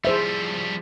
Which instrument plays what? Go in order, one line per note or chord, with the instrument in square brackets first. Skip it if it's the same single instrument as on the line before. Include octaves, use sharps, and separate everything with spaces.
[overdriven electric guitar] F3 G3 [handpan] G#4 C5 E5